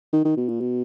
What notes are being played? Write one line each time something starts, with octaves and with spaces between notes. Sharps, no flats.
D#3
D#3
B2
A#2
B2